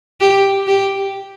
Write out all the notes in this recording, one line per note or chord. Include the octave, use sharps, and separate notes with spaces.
G4
G4